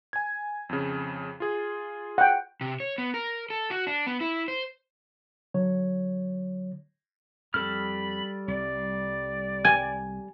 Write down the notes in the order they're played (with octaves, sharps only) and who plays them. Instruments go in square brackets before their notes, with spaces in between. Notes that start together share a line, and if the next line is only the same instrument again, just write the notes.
[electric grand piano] G#5 G#6
F2 C#3
F4 G#4
[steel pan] F#5 G5
[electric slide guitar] C3
C#5
B3
A#4
A4
F#4
D4
B3
E4
C5
[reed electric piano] D3 F#3 C#5
[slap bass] F2 [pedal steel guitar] G3 A4 F6 [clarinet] B5
[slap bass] C2 [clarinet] D5
[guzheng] G#5